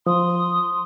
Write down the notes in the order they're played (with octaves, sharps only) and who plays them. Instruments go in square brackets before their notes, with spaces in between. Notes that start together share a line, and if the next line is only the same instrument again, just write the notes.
[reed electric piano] F3 [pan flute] C6 [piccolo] D#6